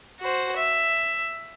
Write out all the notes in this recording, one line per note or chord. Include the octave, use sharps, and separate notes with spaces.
F#4 C5
E5